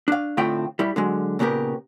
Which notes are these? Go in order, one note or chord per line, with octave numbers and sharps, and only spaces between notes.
D4 F5
A2 D3 A3 C4 F4 G5
G3 E4
D3 F#3 G#3
A#2 C#3 B3 G4 A#4